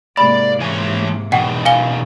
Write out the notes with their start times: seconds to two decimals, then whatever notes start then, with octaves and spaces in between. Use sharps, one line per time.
0.17 G#2 C3 A#3 D5 B5
0.60 E3 C#5 G#5
1.32 B2 D#3 E3 F#5 G5
1.65 F5 G#5 G7